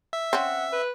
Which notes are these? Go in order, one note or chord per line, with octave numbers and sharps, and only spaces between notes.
E5
C4 C#4 F#5
B4